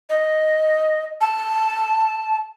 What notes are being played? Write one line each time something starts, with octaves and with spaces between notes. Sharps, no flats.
D#5
A5